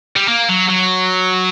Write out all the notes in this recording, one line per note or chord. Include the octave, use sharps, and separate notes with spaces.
G3
A#3
F#3
F#3